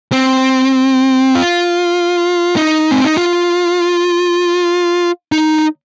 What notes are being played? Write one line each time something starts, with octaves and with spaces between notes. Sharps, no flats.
C4
F4
D#4
C4
D#4
F4
D#4